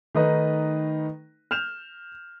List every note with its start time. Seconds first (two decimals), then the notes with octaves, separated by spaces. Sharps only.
0.15 D#3 A3 D#4 B4 D#5
1.51 F6 G6 E7 F7